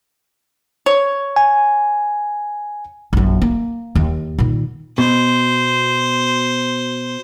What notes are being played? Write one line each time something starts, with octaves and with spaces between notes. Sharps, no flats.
C#5
G#5
A#1 F#2
A#3
D#2
A#2 D#3
B2 C5